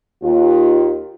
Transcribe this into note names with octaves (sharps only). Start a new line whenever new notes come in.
D#2 F4